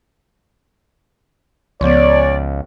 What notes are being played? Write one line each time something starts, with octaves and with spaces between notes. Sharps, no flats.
C#2 F3 B3 C#5 D5